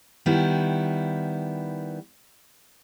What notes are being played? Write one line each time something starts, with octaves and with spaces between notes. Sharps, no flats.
D#3 G3 B3 E4